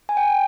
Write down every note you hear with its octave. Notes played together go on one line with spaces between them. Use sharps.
G#5
G5